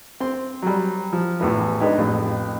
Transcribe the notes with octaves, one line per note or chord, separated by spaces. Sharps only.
C4 C6
F#3 G3
F3
A1 E2 A2 E3 E5
G#3 D4 D#4 B4 G5
A1 F2